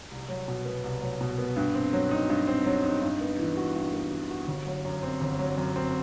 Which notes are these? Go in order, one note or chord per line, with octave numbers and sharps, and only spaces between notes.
C2
F#3
B2
B3
C2
F#3
B2
B3
G2
C4
F#3
D#4
G2
C4
F#3
D#4
G2
B3
E3
F#4
G2
B3
E3
F#4
G1
F#3
F#2
C4
G1
F#3
F#2
C4